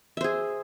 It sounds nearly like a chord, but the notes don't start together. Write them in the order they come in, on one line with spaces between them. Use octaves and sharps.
E5 C5 G#4